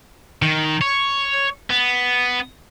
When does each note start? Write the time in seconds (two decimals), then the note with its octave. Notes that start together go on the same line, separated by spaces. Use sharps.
0.42 D#3
0.82 C#5
1.70 B3